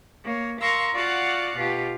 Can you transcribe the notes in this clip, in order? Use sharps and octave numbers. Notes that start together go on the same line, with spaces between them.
A#3 C#5
A#4 F5 A#5 C6 C#6 E6
F4 F#4 D5 F5 F#5 A5
B2 F4 G4